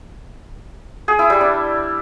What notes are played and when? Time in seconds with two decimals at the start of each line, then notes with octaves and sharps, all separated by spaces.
1.08 G#4
1.19 E4
1.30 G3
1.41 D4